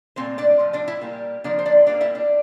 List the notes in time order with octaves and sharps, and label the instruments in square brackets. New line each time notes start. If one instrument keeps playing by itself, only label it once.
[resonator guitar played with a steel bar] A#2 A3 C4 C5
D4 D5
A2 F3
D4 D5
E4 E5
A#2 G3 A#3
D3 F3 A#3 D4 D5
C5
D4 D5
A#2 G3 A#3 D4 D5
E4 E5
D4 D5